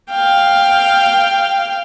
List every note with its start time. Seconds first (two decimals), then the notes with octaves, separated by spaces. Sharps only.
0.11 F5 G5